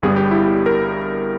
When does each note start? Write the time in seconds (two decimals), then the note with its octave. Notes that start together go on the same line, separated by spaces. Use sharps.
0.02 G1 G2 G3 B3 G#4
0.16 G4
0.31 E4
0.45 G4
0.66 A#4